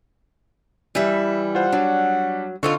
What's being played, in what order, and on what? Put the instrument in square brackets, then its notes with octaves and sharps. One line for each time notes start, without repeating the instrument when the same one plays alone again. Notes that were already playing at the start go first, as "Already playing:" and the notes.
[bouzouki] E3 E5 [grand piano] G3
[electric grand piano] F4 C5 [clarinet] F#5
[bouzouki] F#3 [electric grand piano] D4
[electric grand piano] D3 A4 [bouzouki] C4 D#4 F4 [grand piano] C#6